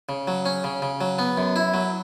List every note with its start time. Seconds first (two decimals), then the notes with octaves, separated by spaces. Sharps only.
0.09 C#3
0.28 F#3
0.46 C#4
0.64 C#3
0.82 C#3
1.01 F#3
1.19 B3
1.37 F#2
1.56 E4
1.74 F#3